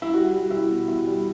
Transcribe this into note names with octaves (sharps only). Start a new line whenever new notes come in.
E4
G3 F#4
G3
G3 E4
B2
B2 E4
G3